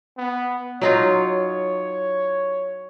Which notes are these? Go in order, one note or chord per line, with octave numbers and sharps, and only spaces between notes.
B3
F#3 D#4 F4 C#5